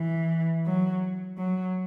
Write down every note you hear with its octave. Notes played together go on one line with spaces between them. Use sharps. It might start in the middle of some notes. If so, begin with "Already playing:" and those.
Already playing: E3
F#3
F#3